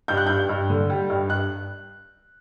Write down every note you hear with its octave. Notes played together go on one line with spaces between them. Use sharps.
G2 G6
F#6
G2 G6
G2
D3
G3
G2
G2 F#6